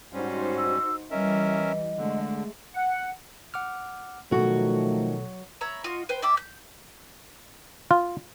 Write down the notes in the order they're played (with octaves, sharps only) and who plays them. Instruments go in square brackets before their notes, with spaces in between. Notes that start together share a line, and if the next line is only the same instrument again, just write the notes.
[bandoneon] G#2 G3 C#4 [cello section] D#4 F#4 C5
[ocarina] E6
[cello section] E3 G3 [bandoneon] C#4 A#4 E5 [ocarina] D#5
[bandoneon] D3 [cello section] G#3 A3
[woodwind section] F#5
[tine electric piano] F#5 D6 F6
[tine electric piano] B2 A4 [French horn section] D#3 F3 A3 [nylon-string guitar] F#3 F#4
[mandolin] C#5 E5 A#5 B5
F4 F#4 D#5
B4 C5 G5
D5 E5 G5 D6
G6
[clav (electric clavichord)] F4